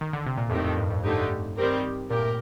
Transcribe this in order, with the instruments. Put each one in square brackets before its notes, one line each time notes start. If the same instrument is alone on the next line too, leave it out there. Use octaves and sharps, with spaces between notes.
[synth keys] D#3
D3
C3
A#2
[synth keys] F2 A2 [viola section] D#3 A3 C4 G4
[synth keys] F2
G2
F2
[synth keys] G2 [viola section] D3 A3 D#4 G4
[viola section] D#3 G3 C4 G4 A#4
[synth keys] A#2 [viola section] G4 A#4
[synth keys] A2